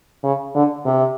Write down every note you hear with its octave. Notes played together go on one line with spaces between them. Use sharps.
C#3
D3
C3